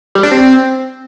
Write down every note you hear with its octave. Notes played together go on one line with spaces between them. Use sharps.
G3
D4
C4